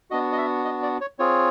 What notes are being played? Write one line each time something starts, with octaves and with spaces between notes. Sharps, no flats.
B3 D4 F#4 D#5
D#5
E5
D#5
D5
C#5
C4 F4 G#4 C#5